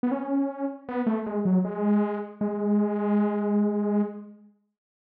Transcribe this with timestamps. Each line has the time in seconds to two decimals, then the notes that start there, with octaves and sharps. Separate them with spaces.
0.03 B3
0.12 C#4
0.89 B3
1.06 A3
1.26 G#3
1.45 F#3
1.65 G#3
2.41 G#3